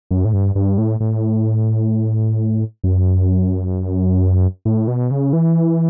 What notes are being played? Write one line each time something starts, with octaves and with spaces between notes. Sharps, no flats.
F#2
A2
G2
G2
A2
A2
F#2
A2
B2
C#3
E3